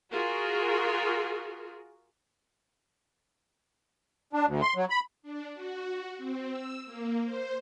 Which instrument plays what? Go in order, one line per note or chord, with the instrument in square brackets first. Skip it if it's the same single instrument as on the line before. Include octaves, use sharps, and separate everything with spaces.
[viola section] F4 F#4 G#4 A#4
[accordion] D4
D2
C6
F#3
B5
[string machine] D4
F#4
C4
E6
A#3
C5